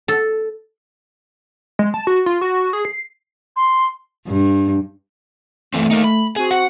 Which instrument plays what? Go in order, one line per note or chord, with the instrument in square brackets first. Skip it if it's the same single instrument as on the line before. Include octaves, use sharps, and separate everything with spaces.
[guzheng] A4
[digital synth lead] G#3
A5
F#4
F4
F#4
G#4
C7
[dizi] C6
[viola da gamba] G2
[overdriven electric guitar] E3 C4 [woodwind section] A3
[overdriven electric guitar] A#3 D#4
B5
[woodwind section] C4 F#4 [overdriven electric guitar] G#4
[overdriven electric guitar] F#5